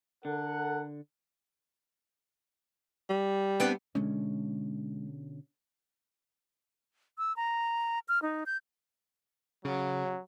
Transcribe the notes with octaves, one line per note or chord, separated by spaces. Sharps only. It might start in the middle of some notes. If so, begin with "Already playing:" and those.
D3 A4 A#4 F#5
G3
B3 C4 D4
B2 D3 G#3 C#4 D4
E6
A#5
F6
D#4
G6
C#3 F#3